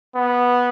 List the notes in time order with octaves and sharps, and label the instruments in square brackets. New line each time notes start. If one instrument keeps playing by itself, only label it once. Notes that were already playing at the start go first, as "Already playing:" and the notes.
[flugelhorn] B3